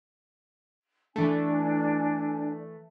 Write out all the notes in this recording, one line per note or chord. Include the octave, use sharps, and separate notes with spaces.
E3 A3 D4 D5 G#5